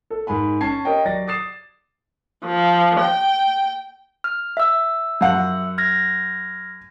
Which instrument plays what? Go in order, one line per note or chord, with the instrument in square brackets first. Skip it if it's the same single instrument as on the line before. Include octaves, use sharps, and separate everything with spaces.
[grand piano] A4
G#2 A#4 G#5 B5
C#4 A5 G#6 C7
G4 A#4 C#5 D#5 G5
F#3 D5 A6 A#6
D6 D#6 A6 C7 E7
[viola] F3
G5
[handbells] F6
E5 E6
[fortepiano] F#2 F#5
[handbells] F6 G#6 A#6